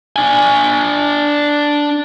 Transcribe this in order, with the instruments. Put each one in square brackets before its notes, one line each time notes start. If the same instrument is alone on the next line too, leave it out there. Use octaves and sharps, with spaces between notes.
[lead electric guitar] D4 G#5